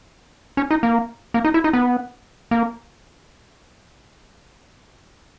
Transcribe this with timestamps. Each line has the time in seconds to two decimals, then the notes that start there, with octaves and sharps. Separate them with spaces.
0.57 C#4
0.71 D#4
0.83 A#3
1.34 A#3
1.45 D#4
1.54 E4
1.64 D#4
1.73 B3
2.51 A#3